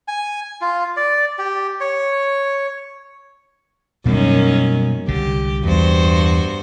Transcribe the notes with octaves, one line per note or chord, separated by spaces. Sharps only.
G#5
F4
D5
G4
C#5
F#2 B2 D#3 G3 A#3 C#4
C2 D3 G4
E2 G2 F#4 C5